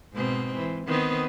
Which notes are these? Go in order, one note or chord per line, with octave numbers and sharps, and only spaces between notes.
G#2 B2 C4
E3
D#3 B3 C4